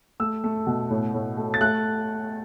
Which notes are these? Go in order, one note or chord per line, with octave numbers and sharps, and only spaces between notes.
A3 E6
A3
B2
A2
A2
A3
A6
A3 F#6